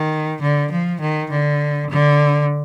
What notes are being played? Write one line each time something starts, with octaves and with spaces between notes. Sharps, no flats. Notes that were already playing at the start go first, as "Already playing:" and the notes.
Already playing: D#3
D3
F3
D#3
D3
D3